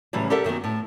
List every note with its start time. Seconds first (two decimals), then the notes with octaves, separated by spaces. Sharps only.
0.13 A2 C#3 E3 F#3 G3
0.30 G4 A4 A#4 D5 E5 F#5
0.44 F#2 D#3 F#3 B3
0.64 A2